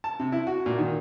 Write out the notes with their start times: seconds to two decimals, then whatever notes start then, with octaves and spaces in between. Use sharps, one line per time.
0.04 A5
0.20 C3
0.32 E4
0.47 F#4
0.66 A#2
0.79 D#3